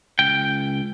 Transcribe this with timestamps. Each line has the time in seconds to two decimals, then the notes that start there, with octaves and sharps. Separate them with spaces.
0.19 C#2 G5